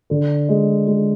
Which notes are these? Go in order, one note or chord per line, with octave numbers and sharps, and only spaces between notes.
D3
G#3
G#3